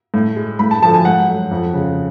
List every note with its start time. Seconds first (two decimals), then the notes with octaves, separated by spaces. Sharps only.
0.14 A2
0.36 G#3
0.59 A2 B5
0.71 A5
0.82 F3 A3 A5
0.94 G#5
1.05 G#2 F#5
1.28 F#3 A3
1.51 F2
1.74 C#3 G#3